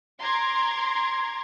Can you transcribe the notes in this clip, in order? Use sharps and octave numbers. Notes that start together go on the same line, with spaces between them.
A#5 C6 D6 G#6